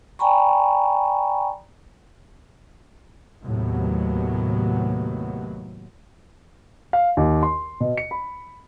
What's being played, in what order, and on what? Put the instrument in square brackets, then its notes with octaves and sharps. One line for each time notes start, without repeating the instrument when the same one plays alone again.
[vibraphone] D5 G5 G#5 A#5 B5 C#6
[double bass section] D#2 A2 C3 F#3 B3
[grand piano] F5
D#2
C6
B2
C#7
B5